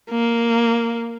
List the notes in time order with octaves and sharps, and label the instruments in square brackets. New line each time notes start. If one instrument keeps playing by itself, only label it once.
[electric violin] A#3